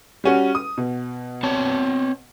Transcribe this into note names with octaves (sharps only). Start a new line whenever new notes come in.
G3 C#4 F#4
D#6
B2
C4 C#5 A5